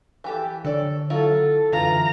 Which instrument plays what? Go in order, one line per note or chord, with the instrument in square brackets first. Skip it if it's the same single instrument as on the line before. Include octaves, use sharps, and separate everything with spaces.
[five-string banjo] E3 G4 A4
[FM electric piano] D3 C#5 [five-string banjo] A4 D5
[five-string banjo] F#3 E4 F4 [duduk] A4
[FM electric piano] F#2 D3 [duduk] E3 [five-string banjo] F4 [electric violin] A#5